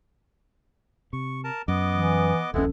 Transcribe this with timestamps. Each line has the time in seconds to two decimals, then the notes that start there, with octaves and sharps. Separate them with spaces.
1.13 C3 C#6
1.44 A#4 A5
1.68 F#2 B3 D#5 D6
1.91 E3
2.54 D#1 A#1 G#3 B3 C#4 E4 A4